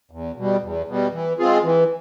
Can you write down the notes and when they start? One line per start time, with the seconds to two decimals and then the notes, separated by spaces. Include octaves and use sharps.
0.11 E2
0.36 B2 G3
0.62 E2
0.87 B2 G3
1.13 E3
1.38 G#3 C4 F4 G#4
1.64 E3